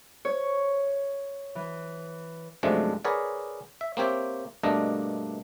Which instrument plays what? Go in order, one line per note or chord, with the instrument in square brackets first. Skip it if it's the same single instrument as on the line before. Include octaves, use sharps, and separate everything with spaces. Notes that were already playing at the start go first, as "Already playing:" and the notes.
[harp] C#5
E3
[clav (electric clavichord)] F#2 C3 F3 G#3 A3 D4
G#4 A#4 B4 C#5 D5 F#5
E5
A#3 C4 G4 C#5 E5
G2 B2 A3 A#3 D4 D#5